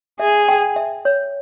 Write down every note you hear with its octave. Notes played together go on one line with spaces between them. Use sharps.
G#4 E5
G5
E5
C#5